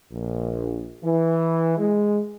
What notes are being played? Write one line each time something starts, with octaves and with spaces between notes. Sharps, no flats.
A#1
E3
G#3